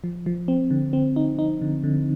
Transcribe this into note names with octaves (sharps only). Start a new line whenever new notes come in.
F3
F3
C4
D3
C4
D#4
D#4
D3
D3